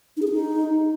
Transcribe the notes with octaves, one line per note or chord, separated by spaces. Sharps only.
D#4
G#4
D4
D#4